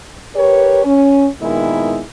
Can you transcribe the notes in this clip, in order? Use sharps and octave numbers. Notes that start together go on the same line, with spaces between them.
G4 A#4 B4 C#5
C#4
A#2 D#3 G#3 B3 D#4 E4